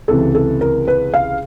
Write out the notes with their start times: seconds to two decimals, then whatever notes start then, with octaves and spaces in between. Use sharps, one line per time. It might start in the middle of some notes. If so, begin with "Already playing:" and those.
0.08 C#2 C3 E3 A4
0.35 A4
0.61 A#4
0.88 B4
1.14 F5